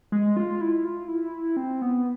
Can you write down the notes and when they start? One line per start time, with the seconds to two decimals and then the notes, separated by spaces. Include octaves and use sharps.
0.12 G#3
0.37 F4
0.61 E4
0.85 F4
1.08 E4
1.57 C4
1.82 B3